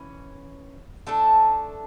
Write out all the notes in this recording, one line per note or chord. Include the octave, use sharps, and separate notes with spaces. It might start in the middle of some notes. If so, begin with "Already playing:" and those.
Already playing: E3 C#4
A3 D4 A4